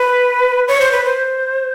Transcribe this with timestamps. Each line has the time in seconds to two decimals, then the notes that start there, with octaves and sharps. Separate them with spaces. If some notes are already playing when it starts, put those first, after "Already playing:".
Already playing: B4
0.68 C#5
0.80 C5
0.92 B4
1.05 C5